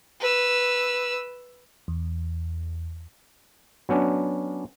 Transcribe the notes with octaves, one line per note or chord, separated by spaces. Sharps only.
B4 E6
E2
F#3 B3 C#4 D4